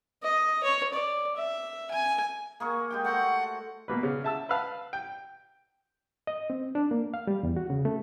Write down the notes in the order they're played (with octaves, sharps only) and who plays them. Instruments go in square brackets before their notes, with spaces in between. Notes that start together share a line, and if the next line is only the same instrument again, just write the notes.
[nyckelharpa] D#5
C#5
D5
E5
G#5
[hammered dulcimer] A#3 G#4 C#6
G#3 G4 G5
[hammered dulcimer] A3 F#4 C5 [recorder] F#5
[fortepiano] B2 A#3 B4
C#3
E5 A5 E6
B4 F5 A5
G5
[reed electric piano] D#5
C4
D4
A#3
F5
G3
E2
F#4
C#3
A3